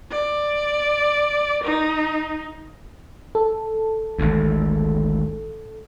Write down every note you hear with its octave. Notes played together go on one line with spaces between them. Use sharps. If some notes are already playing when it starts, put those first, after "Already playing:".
D5
D#4
A4
G#1 D2